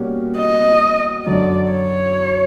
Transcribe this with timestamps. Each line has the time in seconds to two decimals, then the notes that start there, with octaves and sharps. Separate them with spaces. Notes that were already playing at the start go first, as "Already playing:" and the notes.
Already playing: B2 G3 A#3 C#4 F#4
0.37 D#5
1.26 F#2 D3 F#3 D5
1.71 C#5